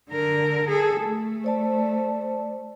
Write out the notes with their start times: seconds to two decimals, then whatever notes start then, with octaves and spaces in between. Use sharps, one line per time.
0.10 D3 A#4
0.69 G#4 A4
1.04 A3
1.44 C5 D5 A5